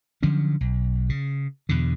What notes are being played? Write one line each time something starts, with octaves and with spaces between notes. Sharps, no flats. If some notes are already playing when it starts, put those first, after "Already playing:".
D3 F3 F#3 C#4
B1
C#3
E2 B2 D3